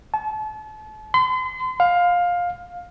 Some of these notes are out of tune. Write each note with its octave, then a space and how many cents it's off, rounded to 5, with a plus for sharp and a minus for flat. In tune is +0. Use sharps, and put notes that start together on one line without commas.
A5 -35
C6 -40
F5 +15